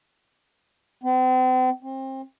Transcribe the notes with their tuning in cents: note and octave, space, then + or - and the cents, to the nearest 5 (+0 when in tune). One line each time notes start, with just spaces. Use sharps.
C4 -40
C4 +30